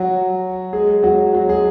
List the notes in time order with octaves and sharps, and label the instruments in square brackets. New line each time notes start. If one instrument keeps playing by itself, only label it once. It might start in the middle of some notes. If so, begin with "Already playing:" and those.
Already playing: [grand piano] F#3 F#4
G#3 G#4
F#3 F#4
F#3 F#4
G#3 G#4